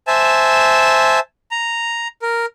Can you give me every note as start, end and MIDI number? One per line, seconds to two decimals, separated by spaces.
0.07 1.19 72
0.07 1.19 76
0.07 1.19 80
0.07 1.19 81
1.51 2.08 82
2.22 2.46 70